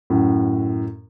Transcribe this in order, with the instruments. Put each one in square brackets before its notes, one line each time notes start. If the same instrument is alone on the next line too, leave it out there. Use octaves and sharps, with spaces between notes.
[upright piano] F#2 A2